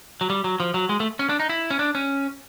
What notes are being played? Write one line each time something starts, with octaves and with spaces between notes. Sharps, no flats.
F#3
G3
F#3
F3
F#3
G#3
A3
C#4
D4
D#4
E4
C#4
D4
C#4